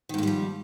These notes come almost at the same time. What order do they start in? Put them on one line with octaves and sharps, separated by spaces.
D#3 G#2 A#3 G3 F3